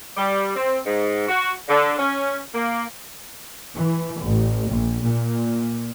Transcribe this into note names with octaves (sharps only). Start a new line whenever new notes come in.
G3
C4
G#2
F#4
D3
C#4
A#3
E3
A1
A#1
A#2